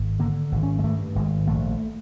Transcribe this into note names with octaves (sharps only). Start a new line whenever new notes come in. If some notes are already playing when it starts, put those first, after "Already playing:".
Already playing: G#1
D3 A#3
G#1
C#4
G#3
G2 A3
G#1 G#3
A#1 A3